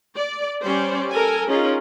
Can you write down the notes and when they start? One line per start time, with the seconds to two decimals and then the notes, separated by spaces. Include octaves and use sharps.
0.16 D5
0.63 G3 C#4 C5 D5
1.11 A4 A#4 G#5
1.49 C#4 D#4 F4 G#4 A#4